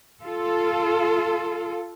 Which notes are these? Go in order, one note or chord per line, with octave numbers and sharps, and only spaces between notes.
F4 A4